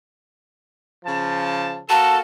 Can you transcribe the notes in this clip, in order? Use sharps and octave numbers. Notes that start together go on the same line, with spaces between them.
C#3 F3 A5
A#3 F#4 A4 A5